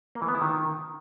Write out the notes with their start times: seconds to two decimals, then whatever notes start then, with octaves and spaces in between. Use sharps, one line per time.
0.15 A#3
0.22 E3
0.28 B3
0.35 E4
0.41 D#3